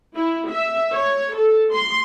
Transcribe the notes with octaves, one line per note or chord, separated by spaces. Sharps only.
E4
E5
C#5
A4
C6